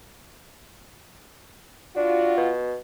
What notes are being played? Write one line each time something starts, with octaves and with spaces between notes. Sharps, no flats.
D4 F4 F#4
B2